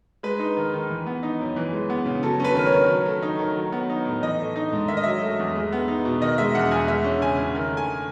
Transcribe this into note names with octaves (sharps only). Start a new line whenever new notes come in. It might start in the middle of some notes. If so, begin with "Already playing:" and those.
G#3 B4
D#4
D#3
D#3
E3
B3
D#4
F#2
E3
G#3
B3
C#3
F#3 A4
C#4 B4
D#3
C#5
D#3
F#3
A3
D#4
D#3
F#3
B3
D#4
A2
E3 D#5
A3
D#4
G#2
D#3 E5
D#5
F#3 E5
A3
E2
G#3
B3
D#4
B2
D#3 D#5
G#3 E5
E2 F#5
E2 G#5
G#3 E5
C#4
C#3 G#5
C#3
D#3
A3
G#5